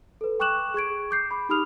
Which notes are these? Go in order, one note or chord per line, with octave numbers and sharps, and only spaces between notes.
A4 B4
G5 C#6 D6 F#6 E7 F#7
G#4 C#6 G#6 D7
D6 G6 C7
B5 D6
D#4 G4 B5 D#6 F6 F7